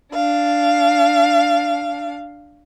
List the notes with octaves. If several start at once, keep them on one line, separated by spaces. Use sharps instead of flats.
D4 F5